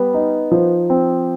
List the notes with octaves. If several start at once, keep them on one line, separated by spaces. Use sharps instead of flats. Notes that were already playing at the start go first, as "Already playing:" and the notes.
Already playing: G3 B3
D#4
F3
C4